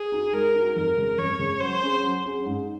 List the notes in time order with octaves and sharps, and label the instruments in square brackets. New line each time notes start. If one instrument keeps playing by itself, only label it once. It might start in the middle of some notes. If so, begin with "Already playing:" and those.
Already playing: [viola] G#4
[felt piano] D#4 F#4
[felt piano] G#3 [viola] A#4
[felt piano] D#4
F#4
[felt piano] F2 [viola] A#4
[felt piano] C#3 G#3
[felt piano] F2 [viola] C#5
[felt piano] C#3 G#3
[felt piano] F#3 [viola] C5
[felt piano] C#4 G#4
F#3
C#4 G#4
G#2